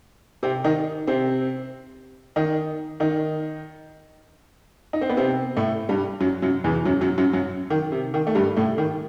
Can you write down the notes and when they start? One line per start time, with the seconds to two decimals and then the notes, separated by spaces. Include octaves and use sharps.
0.43 C3 C4
0.64 D#3 D#4
1.07 C3 C4
2.36 D#3 D#4
3.00 D#3 D#4
4.93 D#4
5.01 C4
5.09 B3
5.17 C3 C4
5.57 A2 A3
5.89 G2 G3
6.21 F#2 F#3
6.42 F#2 F#3
6.64 E2 E3
6.85 F#2 F#3
7.01 F#2 F#3
7.18 F#2 F#3
7.33 F#2 F#3
7.70 D#3
7.92 C3
8.14 D#3
8.27 A3
8.35 G2 G3
8.57 A2 A3
8.78 D#3